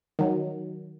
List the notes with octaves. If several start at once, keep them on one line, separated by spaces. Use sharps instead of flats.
D#3 F#3